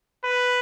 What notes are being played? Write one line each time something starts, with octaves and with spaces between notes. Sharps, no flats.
B4